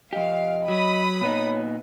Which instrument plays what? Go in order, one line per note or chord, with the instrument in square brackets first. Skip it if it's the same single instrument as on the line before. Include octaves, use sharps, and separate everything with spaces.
[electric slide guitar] F2 G4 [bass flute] D#5 [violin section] F5
[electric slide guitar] F#3 [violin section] B5 D#6
[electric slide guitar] A#2 B3 D#4 [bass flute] C#5